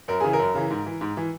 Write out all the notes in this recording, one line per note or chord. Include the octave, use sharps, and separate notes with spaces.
F#2 A#4
C#3 E3 G#4
A#4
F#2
C#3 E3
G#2
E3
G#2
E3